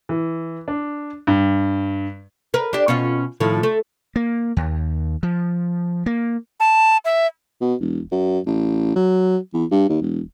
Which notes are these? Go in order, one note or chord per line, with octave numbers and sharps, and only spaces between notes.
E3
D4
G2
A#4 B4
D4 G4
B2 C#4 F4
A2 D#3 F3
A3
A#3
D#2
F3
A#3
A5
E5
B2
E1
F#2
A1
F#3
E2
G2
D#2
E1